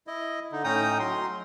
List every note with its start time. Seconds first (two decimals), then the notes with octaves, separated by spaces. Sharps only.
0.07 E4 D#5
0.52 D3 D#4
0.64 A2 C#4 D#4 G5 A#5 D#6
0.99 F#3 C6